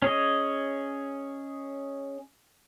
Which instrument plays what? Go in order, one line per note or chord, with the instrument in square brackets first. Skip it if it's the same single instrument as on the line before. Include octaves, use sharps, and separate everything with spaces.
[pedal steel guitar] C#4 G#4 C#5 D#5